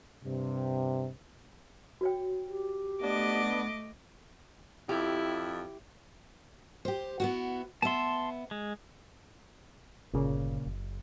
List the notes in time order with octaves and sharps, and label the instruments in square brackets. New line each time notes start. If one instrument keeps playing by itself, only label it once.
[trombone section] G2 C3
[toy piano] F#4 C#5 G5
[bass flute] G4
[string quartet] A3 D#5 D6 [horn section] B3 D4
[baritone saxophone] F2 [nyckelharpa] E4 [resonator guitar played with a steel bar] G4
[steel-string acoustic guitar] G4 C5
B3 E4 F#4
[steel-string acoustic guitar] B3 E5 [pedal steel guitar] A5 C6
[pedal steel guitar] G#3
[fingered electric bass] G1 [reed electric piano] A#2 C#3 A#3
[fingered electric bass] F#1